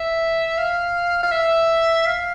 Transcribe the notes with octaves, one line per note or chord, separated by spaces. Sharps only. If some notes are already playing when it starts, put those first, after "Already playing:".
Already playing: E5
F5
F5
E5
F5